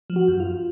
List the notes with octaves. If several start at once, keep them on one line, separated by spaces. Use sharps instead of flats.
F3
F#4
F#2
F4